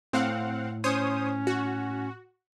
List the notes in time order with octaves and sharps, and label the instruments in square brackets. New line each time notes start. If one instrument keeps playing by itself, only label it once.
[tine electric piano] A2 [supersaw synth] C4 F5 F#5
[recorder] C#4 [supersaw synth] C5 C#5 D#6
[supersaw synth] F#4